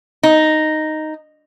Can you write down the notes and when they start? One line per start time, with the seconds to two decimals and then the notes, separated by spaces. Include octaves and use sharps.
0.23 D#4